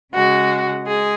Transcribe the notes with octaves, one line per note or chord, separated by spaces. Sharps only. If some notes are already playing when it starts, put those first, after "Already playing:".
C#3 G#3 F#4
G#3 G#4